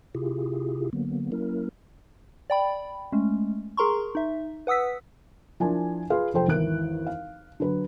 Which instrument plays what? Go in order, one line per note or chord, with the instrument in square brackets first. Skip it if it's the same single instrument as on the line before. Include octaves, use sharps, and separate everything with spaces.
[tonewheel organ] C3 E4 F4 G4 G#4
D3 F#3 A#3 B3
F#3 A#3 C#4 E4 A#4
[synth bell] D5 G5 B5
G#3 A3 C#4
G#4 A#4 A#5 C6 C#6
D#4 E5
B4 F#5 D#6 E6 B6
[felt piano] F3 D4 E4 A#4 G#5
F4 G#4 B4 F5 C6
F1 F3 A4 C5 G5
G#1 E2 E3 A#4 F#6 D7
F5
D3 F#3 B4